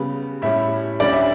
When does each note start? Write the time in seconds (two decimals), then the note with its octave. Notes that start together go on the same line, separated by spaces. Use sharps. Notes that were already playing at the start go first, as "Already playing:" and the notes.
Already playing: C#3 G3 B3
0.42 A2 G3 C#4 E5
1.00 D2 D3 G3 C#4 D5
1.13 E5